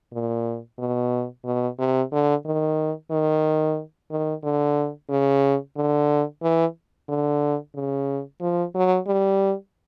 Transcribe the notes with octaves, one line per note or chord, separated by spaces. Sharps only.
A#2
B2
B2
C3
D3
D#3
D#3
D#3
D3
C#3
D3
E3
D3
C#3
F3
F#3
G3